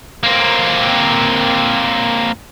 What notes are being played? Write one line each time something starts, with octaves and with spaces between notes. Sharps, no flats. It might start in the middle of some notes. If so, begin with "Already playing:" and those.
A#3 C4